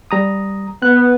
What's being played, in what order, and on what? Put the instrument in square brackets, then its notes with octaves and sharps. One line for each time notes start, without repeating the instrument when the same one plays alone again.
[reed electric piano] G3 A#5 D#6
[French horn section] B3 [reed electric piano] F#6